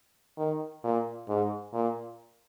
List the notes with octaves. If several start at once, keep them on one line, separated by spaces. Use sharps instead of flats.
D#3
A#2
G#2
A#2